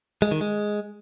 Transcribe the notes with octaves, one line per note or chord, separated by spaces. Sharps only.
G#3
D#3
G#3